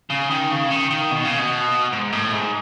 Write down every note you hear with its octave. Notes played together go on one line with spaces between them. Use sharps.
C#3
D#3
C#3
D#3
D#3
B2
C#3
B2
G#2
A2
G#2